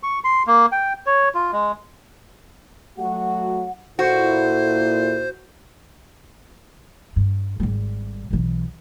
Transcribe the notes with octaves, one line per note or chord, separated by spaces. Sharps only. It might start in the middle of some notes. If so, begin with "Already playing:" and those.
C#6
C6
A#3
G5
C#5
F4
G#3
F#3 A3 F#4 F#5
A#2 E4 F#4 A4 C5
G2
G#1 G3
B1 E3